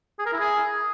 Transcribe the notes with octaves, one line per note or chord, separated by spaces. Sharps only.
G#4
A#4
E4
G#4